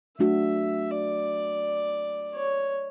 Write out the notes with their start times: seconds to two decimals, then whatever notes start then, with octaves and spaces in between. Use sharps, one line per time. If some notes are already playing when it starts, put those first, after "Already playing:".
0.19 F#3 A3 D4 F#4 E5
0.91 D5
2.34 C#5